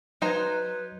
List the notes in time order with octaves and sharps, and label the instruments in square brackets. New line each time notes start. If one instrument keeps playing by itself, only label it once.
[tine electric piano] F#3 G6 G#6 [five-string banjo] D#4 C5 A#5 [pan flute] B4